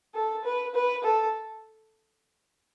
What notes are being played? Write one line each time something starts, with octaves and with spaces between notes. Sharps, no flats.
A4
B4
B4
A4